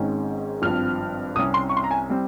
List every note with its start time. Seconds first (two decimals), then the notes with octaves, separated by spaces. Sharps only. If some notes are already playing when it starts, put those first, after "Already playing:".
Already playing: G#1 G#2 D#3 G#3 C#4
0.62 G#1 G2 F3 C4 F6
1.36 C2 C3 G3 C#4 D#6
1.54 C6
1.69 C#6
1.77 C6
1.84 A#5
1.91 G#5
2.10 G3 C4